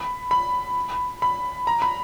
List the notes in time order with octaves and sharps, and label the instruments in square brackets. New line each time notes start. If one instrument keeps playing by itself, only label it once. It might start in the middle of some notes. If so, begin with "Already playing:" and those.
Already playing: [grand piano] B5
B5
B5
A#5
B5